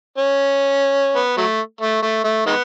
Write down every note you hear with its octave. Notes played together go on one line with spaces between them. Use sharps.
C#4
B3
F#3 A3
A3
A3
A3
D#3 G#3 B3